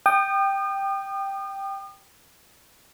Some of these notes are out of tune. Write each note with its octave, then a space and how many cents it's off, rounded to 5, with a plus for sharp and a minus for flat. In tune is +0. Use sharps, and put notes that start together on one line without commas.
G5 +0 D#6 -40